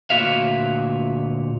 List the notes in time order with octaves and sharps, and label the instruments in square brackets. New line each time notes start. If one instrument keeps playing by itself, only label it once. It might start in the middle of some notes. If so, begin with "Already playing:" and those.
[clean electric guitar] D2 A#2 C#4 F#4 E5 F5